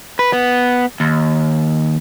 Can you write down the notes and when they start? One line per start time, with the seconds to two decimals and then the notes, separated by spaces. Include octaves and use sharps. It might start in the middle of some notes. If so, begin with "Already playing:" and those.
0.19 B4
0.33 B3
1.00 D#2